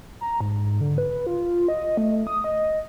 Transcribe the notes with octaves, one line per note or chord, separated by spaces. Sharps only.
A#5
G#2
D3
B4
F4
D#5
A3
D#6
D#5